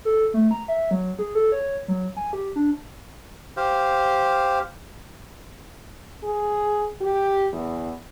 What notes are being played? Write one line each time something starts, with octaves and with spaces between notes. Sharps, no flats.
A4
A3
A#5
E5
F#3
G#4
A4
C#5
F#3
G#5
G4
D4
G4 C5 F5
G#4
G4
E2